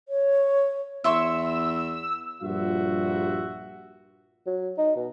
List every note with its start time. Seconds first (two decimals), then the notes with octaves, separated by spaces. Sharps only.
0.09 C#5
1.04 E2 E4 C6 C#6 E6
2.42 A#1 G2 G3 F4 F#4 E5
4.46 F#3
4.78 D#4
4.96 B2